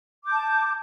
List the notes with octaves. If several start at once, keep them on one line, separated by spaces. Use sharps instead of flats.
A5 D6 G6